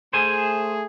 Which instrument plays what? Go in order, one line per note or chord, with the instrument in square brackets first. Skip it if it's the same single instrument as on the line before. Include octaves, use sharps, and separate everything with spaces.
[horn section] A3 G#4 [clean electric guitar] C5 G#5